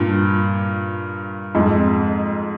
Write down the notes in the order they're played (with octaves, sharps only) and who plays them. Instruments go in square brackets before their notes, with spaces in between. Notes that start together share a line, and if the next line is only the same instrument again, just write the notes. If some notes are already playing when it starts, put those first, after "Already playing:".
Already playing: [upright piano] G2 A#2
F2 G#2